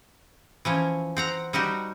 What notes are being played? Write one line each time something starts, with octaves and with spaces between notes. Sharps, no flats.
E3 F3 C#4
C4 F#5 A#5
G3 D#4 F#4 G4